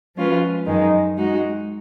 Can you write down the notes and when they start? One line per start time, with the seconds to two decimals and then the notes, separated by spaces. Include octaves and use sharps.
0.15 F3 G#3 C#4 F4 B4
0.66 F#2 D#3 G#3 D#4
1.17 G#3 D#4 F#4